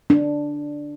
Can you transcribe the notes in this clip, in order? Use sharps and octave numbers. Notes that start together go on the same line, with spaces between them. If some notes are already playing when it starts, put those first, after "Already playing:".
D4